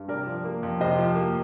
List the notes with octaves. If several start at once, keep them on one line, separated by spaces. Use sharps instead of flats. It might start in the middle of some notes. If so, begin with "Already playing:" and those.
Already playing: G2
C3 A#4 D5
F3
A#3
F2
C3 C5 D#5
F3
A#3